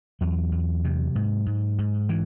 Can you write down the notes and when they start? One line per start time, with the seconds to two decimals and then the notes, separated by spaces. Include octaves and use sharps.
0.21 E2 F#3
0.52 E2
0.84 C3
1.15 G#2
1.46 G#2
1.78 G#2
2.09 E3